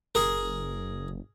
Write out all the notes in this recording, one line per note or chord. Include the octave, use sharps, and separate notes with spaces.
F#1 G#4 A#4